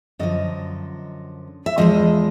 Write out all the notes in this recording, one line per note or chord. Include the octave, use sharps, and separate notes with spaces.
F#2 D3 F3 D#5
E5
E2 C3 F3 G#3 D#5